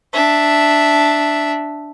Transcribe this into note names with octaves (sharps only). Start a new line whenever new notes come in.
D4 E5